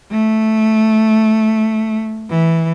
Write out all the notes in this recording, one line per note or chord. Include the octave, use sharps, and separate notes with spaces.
A3
E3